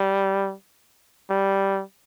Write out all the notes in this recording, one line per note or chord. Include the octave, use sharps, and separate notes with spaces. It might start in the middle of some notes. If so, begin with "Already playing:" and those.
Already playing: G3
G3